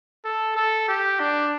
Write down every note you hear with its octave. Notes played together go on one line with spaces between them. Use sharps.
A4
A4
G4
D4